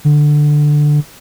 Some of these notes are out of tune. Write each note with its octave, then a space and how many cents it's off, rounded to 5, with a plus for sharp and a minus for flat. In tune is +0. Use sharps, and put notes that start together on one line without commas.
D3 +10